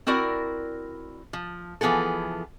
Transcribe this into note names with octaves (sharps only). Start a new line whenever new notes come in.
C4 E4 F#4 A#4 D5
F3
E3 F3 B3 G#4 A4